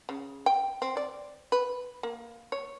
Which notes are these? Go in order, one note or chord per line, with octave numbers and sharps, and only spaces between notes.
C#3
G5
C4
D5
B4
A#3
C#5